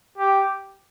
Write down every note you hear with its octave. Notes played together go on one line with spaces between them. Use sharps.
G4